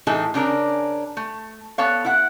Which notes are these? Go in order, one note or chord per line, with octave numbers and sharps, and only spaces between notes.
A2 E3 D#4 G#4 A4
C#3 C#4 D4 A#4
A3
B3 A4 C#5 F5
E4 F#5